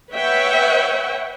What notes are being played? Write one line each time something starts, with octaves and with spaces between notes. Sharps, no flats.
B4 C#5 E5 F#5 G5